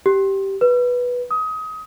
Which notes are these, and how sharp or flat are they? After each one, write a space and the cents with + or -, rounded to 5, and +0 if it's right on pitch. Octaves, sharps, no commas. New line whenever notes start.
G4 -10
B4 -10
D#6 +25